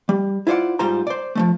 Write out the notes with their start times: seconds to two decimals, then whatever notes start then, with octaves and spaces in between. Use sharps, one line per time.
0.09 G3
0.47 E4 F4 C5 D5 F#5
0.79 G#2 G3 F4 C5 A#5
1.07 C5 D5
1.35 F3 G#3 A3